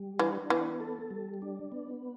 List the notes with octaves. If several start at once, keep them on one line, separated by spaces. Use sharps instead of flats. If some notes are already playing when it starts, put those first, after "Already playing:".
Already playing: G3
E3 D4
E3 B3
A4
G3
D4
B3